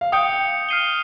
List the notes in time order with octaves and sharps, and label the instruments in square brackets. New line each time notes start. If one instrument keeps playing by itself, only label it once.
[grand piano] F5
[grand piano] G5 [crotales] D#6 G6 C#7
[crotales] F6 C7 D#7 G7